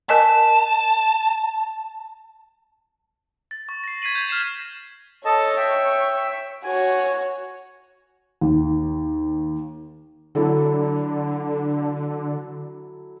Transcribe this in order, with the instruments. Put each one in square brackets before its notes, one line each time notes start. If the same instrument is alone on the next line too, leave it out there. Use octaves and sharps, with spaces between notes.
[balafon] A#4 D#5 G#5 [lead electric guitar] A5
[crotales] A6
C#6
A#6 C7
G#6 B6 C7 D#7 F#7
G6 F7
F6 B6 C7 E7
[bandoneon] A4 D#5 A5 [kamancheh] C#5
[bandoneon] E5 G5
[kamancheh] F#4 C#5 [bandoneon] G#5
[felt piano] D#2
[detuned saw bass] D3 [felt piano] F#3 E4 A4